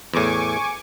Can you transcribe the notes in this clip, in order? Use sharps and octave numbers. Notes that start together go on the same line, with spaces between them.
E2 A2 G#5 C#6 D6